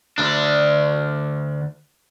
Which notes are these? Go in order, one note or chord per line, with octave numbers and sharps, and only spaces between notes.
D2 D4